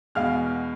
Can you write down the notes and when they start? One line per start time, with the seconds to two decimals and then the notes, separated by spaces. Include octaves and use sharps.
0.15 E2 B2 G#3 F5 F6